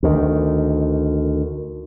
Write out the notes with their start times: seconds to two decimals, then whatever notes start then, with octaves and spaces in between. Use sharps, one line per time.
0.03 D2 D#3